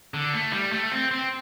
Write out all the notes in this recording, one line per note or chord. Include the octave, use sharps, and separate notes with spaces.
D3
A3
G3
A3
C4
C4